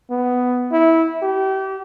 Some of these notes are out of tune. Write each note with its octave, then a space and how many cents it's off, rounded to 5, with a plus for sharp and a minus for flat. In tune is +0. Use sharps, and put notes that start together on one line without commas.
B3 +10
E4 -15
G4 -30